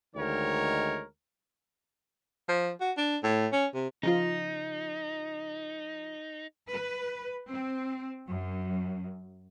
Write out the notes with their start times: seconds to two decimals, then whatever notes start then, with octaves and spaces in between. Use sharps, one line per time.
0.16 D2 D#3 G#3 A#4 C#5
2.48 F3
2.81 F#4
2.97 D4
3.23 A2
3.52 C#4
3.74 C3
4.03 C#3 F3 D#4 F4
6.69 B4
7.49 C4
8.28 F#2